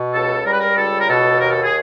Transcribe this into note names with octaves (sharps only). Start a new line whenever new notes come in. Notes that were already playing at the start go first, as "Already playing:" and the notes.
Already playing: B2
C#2 A4
G3 A#4
B4
A#4
C#2 A4
A#4
B2 A4
D#2 A#4
A4
G#4